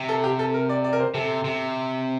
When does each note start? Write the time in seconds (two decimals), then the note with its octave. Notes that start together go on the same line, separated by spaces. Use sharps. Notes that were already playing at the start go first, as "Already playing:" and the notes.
Already playing: C3
0.09 A4
0.24 G4
0.39 A4
0.54 A#4
0.69 D5
0.84 D5
0.93 A#4
1.00 C5
1.14 C3 A4
1.44 C3